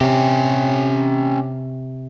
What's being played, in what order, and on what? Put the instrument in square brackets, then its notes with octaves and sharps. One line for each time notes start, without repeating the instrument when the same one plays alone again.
[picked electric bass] C3 [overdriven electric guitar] C#4 G4